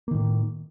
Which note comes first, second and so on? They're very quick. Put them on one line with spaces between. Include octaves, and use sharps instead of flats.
A#3 D#3 A2